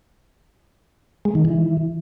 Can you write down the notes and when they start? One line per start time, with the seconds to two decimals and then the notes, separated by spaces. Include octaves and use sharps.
1.25 G#3
1.35 D#3
1.45 E3